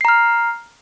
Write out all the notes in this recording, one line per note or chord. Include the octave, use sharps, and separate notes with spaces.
A#5 F6 C7